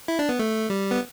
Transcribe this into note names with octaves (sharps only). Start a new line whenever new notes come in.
E4
D4
B3
A3
G3
B3